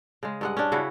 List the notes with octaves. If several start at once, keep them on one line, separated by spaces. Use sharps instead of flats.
C#3 G#3
G2 G#3 F#5
C#4 D4
C#3 E4 F#4